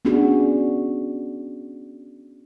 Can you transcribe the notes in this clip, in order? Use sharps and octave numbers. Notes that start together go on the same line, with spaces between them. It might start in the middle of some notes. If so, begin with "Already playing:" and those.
B3 C#4 D4 F#4 G#4